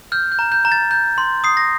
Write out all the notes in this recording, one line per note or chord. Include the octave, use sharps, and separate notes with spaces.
F6 G6
G6
A#5
G6
A#5
A6
G6
C6
D#6 C7
A#6